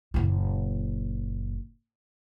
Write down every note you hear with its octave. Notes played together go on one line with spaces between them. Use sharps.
F#1 A#2